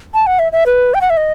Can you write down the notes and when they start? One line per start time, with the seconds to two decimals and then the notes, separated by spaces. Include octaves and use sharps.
0.14 A5
0.27 F#5
0.39 E5
0.52 E5
0.66 B4
0.94 G5
1.01 F#5
1.10 E5
1.17 D#5